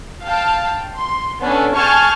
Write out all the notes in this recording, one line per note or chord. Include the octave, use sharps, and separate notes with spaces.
F5 G5 A5
C6
B3 C#4 D4 A4
G#4 G#5 A5 C#6 F6 G6